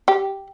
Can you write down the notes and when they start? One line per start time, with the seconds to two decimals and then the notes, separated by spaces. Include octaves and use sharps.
0.08 G4